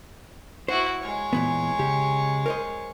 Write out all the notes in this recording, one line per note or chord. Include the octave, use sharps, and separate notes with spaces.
E4 F#4 C5
G#3 C#5
A#2 E3 B3
C#3 G4
A#4 C5 D#5